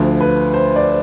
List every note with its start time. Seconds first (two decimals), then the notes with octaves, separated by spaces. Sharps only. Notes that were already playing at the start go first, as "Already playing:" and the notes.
Already playing: D2 D3 F3
0.21 B4
0.54 C5
0.76 D5